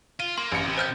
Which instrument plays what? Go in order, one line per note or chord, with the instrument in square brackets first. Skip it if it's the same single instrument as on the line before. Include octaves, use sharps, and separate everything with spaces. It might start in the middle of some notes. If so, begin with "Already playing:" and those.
[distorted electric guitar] F4 [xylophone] D#7
[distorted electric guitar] A#3 [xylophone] C6
[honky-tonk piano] A1 C#7
[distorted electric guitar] C3
[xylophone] C5 F6 G6